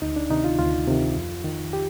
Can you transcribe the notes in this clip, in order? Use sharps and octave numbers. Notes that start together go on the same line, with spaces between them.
D2 D#4
D4
C3 D#3 D#4
F4
D2 F4
C3 D#3
F2
D#3
G4